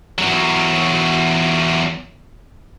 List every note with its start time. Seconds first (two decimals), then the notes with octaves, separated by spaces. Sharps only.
0.18 E2 F#3